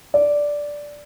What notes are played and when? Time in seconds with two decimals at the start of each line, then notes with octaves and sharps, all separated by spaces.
0.14 D5